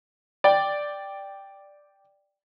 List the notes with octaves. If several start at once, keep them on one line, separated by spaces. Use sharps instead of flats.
D5 G5